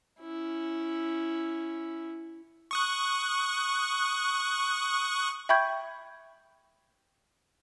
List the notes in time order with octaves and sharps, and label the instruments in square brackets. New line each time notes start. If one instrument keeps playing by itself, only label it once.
[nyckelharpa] C#4 E4
[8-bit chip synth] C#6 D#6 F#6
[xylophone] E5 G5 B5 C#6 G6 G#6